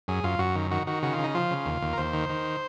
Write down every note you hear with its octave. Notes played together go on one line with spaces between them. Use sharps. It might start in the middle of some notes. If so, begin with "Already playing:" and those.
F#2 G#4
F#2 F4
F#2 F#4
D#3
D#3 F#4
D#3 F#4
C#3 F#4
F4
C#3
D#4
F3 F4
C#3
D#2
D#2
A#4
D#2 C5
D#3
D#3